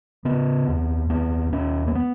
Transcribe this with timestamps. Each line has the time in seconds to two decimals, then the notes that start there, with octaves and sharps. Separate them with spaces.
0.25 C#3 B3
0.68 D#2
1.10 D#2 B3
1.52 D#2 C#4
1.88 A#3
1.95 B3